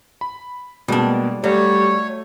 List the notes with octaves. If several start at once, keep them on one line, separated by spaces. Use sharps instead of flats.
B5
B2 G3 G#3 A#3 D4
F#3 G3 A3 C#5